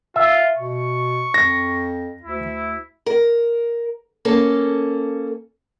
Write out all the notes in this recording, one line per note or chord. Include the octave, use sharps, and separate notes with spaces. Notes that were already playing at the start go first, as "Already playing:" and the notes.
F4 E5
B2 C#6
F2 A#6
D2 E4
A#4
A#3 C#4 A4